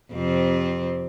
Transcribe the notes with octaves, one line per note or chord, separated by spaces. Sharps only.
F2 C3 C4